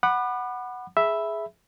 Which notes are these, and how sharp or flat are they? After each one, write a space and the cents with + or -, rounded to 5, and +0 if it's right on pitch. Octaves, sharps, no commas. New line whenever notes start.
F#5 +0 B5 +0 D6 +45
G#4 +10 E5 +0 B5 +0